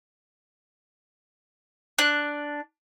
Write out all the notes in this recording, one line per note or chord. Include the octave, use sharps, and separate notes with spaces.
D4 F#6